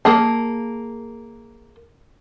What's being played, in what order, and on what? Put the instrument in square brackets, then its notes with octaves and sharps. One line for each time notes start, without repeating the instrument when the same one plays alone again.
[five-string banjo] A#3 G#4 A5